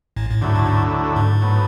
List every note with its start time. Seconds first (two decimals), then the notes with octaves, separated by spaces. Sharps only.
0.16 A1 A2
0.30 A2
0.41 D2 G#2 D3 F#3 A3 E4
0.55 A2
0.66 G#2
1.16 G#2
1.41 A2 F#3 B3